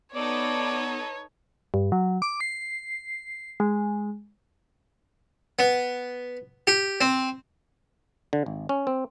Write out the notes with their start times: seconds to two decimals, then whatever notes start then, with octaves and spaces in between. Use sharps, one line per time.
0.15 B3 D#4 A4 B4 C#5 D5
1.74 G2
1.92 F#3
2.22 D6
2.41 C7
3.60 G#3
5.59 B3
6.67 G4
7.01 C4
8.33 D3
8.46 G#1
8.69 C#4
8.87 C4